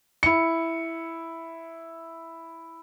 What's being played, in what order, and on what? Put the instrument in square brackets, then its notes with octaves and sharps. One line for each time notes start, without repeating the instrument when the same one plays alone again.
[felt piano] E4 C#7